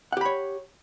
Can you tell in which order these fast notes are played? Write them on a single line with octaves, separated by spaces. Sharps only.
F#5 G4 B5 C#5